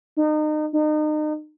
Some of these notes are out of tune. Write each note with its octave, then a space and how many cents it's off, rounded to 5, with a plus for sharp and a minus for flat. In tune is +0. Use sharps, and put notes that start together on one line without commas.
D#4 -30
D#4 -35